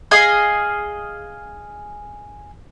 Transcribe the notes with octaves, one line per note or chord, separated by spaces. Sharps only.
G#4 D#5 F5 G#5